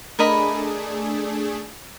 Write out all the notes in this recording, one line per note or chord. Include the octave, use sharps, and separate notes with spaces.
A3 D4 G#4 A#4 D#5 B5